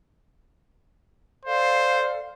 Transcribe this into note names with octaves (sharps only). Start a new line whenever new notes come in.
A4 C5 D5 F5